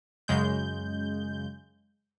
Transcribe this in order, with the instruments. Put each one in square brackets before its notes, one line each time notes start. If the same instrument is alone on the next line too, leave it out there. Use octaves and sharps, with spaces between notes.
[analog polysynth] F#2 C#3 G#3 G6